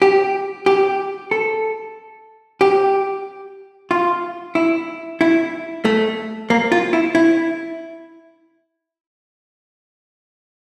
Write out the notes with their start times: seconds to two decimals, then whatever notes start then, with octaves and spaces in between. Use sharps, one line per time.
0.02 G4
0.66 G4
1.31 A4
2.61 G4
3.91 F4
4.55 E4
5.21 E4
5.85 A3
6.50 A#3
6.72 F4
6.93 E4
7.15 E4